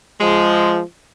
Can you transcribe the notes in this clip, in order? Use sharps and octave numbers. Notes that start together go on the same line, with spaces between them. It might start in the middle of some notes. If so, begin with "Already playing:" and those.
F3 G#3